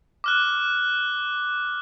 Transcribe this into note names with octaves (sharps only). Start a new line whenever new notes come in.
D6 F6 F#6